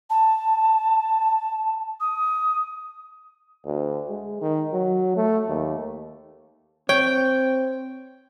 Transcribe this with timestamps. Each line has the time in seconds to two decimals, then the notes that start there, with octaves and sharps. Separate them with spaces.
0.10 A5
2.00 D#6
3.66 D2
4.10 G#3
4.41 D#3
4.73 F#3
5.17 A3
5.48 D#2
6.89 C4 C#5 G5